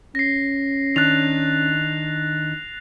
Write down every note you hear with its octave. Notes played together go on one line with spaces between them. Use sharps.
C#4 A#6 C7
D#3 D4 F#6 A6 F7